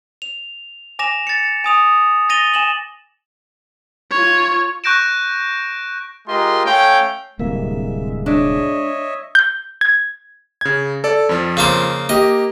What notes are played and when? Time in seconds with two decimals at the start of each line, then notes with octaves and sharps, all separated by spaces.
0.22 F7
0.99 G#5 D6 A#6 E7 F7
1.27 A6 C#7
1.64 G#5 D#6 F7
2.29 A6 A#6 D#7 F7 G7
2.54 G#5 E7 F#7
4.11 F4 C#5
4.84 C#6 F#6 G6 A#6 D7 E7
6.28 G#3 F4 G4 A#4 D#5 C6
6.66 A3 C#4 C#5 F5 G5
7.39 D1 C2 G#3 A#3 E5
8.26 D4 C#5 D#5 E5
9.35 G6
9.81 G#6
10.61 C#3 G#6
11.04 A4 D5
11.29 F2 F3
11.57 C#3 A#3 C5
12.09 A#3 G4 D#5